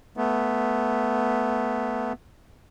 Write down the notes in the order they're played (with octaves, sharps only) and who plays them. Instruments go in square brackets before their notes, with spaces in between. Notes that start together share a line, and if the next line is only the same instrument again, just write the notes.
[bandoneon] A3 B3